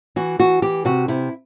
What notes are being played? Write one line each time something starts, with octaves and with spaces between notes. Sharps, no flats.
E3 F#4
E3 F#4
E3 G4
C3 F#4
C3 E4